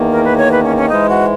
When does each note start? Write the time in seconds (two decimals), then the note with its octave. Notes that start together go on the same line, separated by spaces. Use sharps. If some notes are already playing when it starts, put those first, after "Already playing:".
Already playing: E2 D#3 A#3
0.12 A#4
0.25 B4
0.38 C#5
0.51 B4
0.63 C#4
0.77 C#4
0.89 G#2 E3 G#3 D#4
1.09 F#4